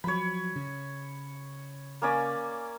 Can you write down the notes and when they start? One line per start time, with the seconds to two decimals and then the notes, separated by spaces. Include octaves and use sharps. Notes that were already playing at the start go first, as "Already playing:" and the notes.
0.04 F3 F#3 C#5 B5
0.56 C#3
2.02 A#3 C#4 D5